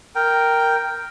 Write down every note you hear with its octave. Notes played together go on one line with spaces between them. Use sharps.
A#4 G5